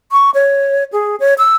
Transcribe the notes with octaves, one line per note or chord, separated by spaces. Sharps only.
C#6
C#5
G#4
C#5
E6